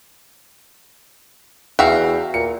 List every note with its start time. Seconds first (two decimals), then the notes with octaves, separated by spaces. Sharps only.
1.79 E2 F#4 E5 F5 G5
2.34 A#2 C#7